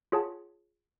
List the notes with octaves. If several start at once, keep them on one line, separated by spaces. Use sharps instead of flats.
F4 G#4 C#5 F#5 A5